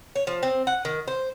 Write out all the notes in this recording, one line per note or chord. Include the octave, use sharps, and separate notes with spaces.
C#5
F3
C4
F#5
D#3
C5